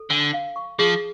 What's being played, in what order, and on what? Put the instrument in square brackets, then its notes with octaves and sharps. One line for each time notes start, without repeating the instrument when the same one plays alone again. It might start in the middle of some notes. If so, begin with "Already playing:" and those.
Already playing: [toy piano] A4
[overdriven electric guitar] D3 [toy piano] G#5
[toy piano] F5
C#6
[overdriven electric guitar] F3 [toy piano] G#4